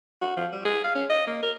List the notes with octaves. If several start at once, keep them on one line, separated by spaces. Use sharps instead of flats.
F#4
F3
G3
G#4
F5
C#4
D#5
A#3
A#4